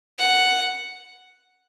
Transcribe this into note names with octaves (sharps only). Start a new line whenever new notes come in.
F#5